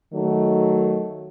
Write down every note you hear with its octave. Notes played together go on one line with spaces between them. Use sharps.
D#3 F#3 A3